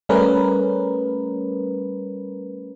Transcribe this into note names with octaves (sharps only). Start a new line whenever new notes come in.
G3 A3 C#4 A#4 B4